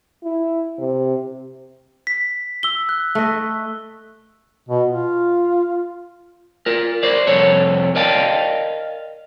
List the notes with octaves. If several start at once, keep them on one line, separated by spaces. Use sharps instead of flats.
E4
C3
B6
E6 G7
F#6
A3 D#5
B2
F4
F4 A#4
A#4 C5 D5
C2 F2 A4 C#5
A#4 D5 D#5 F5 G5 A5